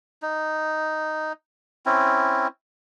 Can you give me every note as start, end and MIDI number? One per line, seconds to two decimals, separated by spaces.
0.22 1.33 63
1.86 2.47 60
1.86 2.47 61
1.86 2.47 64